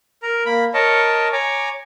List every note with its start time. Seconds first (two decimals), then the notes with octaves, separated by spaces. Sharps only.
0.23 A#4 A#5
0.46 A#3 B5
0.74 A#4 C#5 D#5 A5
1.33 C#5 G#5 A#5 D6